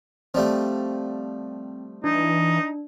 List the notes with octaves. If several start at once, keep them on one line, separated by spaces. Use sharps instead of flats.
F3 G3 A3 C4
E3 D4 D#4